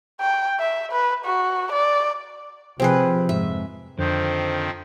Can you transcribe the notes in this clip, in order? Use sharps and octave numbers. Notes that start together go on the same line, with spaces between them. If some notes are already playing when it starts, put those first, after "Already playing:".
G5
E5
B4
F#4
D5
C3 F3 C4 G#4 B4
F2 G#2 E5
F2 D3 D#3 F3 C4 C5